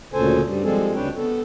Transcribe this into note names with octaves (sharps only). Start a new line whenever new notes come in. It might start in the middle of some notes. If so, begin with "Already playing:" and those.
D2 A#2 C#3 A4 C5 G#5
G2 G3
F3 G3 G#3 C4 G#4 A4
D2 C#3 D4 B4 C#5 G5
B3 A4